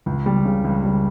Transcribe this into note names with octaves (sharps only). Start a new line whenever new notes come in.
C#2
G3
C#3
C#2
G3